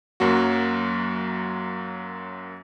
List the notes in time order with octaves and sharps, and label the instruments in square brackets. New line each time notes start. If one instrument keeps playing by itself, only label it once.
[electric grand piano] F#2 F#3 A#3 F#4